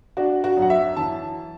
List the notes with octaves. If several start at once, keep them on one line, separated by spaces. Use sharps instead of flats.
D4 F#4
F#4
F#2
F#5
E5
E3 A5